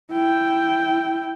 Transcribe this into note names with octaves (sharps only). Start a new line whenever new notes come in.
E4 G5